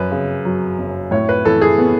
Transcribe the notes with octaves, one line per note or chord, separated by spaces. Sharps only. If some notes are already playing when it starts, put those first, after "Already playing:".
Already playing: F#2 B4
C#3
F#3
F#1
A2 C#5
B4
E3 A4
G#4
B3